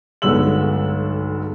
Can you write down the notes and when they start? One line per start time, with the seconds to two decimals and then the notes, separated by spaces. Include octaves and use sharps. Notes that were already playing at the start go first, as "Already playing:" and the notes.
0.22 B1 G2 D3 G#3 E6 F#7